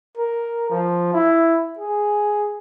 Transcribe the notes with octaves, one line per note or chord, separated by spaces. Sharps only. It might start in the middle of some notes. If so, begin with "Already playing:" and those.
A#4
F3
E4
G#4